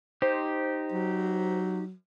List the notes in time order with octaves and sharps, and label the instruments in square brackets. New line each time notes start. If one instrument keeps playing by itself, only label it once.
[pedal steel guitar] D#4 G4 [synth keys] C5
[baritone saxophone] F#3